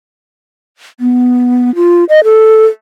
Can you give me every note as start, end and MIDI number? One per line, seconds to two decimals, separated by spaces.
1.00 1.74 59
1.75 2.04 65
2.09 2.23 75
2.24 2.66 69